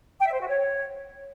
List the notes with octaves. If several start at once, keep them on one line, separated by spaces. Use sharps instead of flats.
G5
E5
C5
F#4
C#5